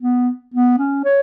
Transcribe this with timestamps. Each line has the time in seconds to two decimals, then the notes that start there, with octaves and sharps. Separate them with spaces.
0.02 B3
0.54 B3
0.79 C#4
1.05 C#5